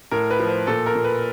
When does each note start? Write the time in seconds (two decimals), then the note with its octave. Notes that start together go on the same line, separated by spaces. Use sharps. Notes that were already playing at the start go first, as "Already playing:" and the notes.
0.11 A2 A#4
0.30 B4
0.40 F3
0.49 C5
0.67 A#2 A4
0.86 A#4
0.95 A#2
1.04 B4